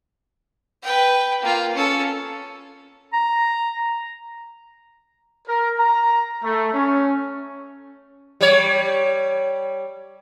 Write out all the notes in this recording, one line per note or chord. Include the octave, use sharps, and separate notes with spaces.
B4 G5
A#3 F4
C#4 A4
A#5
A#4
A#5
A3
C#4
G3 C#5